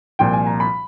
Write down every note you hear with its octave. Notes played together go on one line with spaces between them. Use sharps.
C2 A#2 F3 G5
G#5
A#5
B5